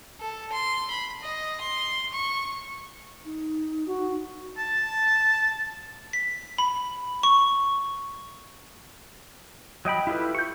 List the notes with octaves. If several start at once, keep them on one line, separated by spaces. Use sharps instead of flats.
A4
C6
B5
D#5
C6
C#6
D#4
F#4
A5
B6
B5
C#6
F#3 D#5 G5 B5
E4 F4 G4 A4 B4
C#6 G6